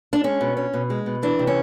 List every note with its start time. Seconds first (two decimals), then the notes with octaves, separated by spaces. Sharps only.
0.13 D4
0.24 G#3 C#4
0.41 B2
0.57 C#4
0.74 B2
0.90 G#3
1.06 B2
1.23 E3 D4
1.39 C3
1.47 C#4